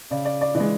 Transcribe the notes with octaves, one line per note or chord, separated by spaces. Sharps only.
C#3 D5
D5
D5
E3 D5
G#3